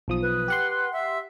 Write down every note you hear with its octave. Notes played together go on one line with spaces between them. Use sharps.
B1 F3 D#6
B4
G4 F#5 C6
E5